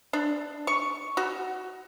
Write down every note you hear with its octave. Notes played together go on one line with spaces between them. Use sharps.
D4
C#6
F#4